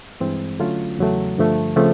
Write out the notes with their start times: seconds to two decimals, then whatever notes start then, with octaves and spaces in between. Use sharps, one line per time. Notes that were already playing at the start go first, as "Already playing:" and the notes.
0.21 G2 E3 G#3 C4
0.59 D3 F#3 A3 C#4 F4
0.99 E2 C#3 F#3 A3
1.38 G2 D3 F3 A3
1.76 C#3 F3 A3 C4 F4